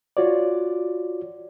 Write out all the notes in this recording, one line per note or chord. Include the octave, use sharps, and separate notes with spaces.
F4 F#4 C#5 D5